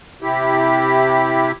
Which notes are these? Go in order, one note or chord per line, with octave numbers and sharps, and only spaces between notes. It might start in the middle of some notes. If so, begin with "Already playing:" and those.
C3 E4 G4